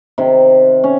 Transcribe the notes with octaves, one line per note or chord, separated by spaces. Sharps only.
C3 D#3
C#4